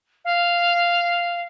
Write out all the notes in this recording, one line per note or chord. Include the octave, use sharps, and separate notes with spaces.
F5